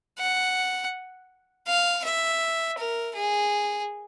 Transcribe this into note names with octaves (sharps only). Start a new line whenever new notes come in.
F#5
F5
E5
A#4
G#4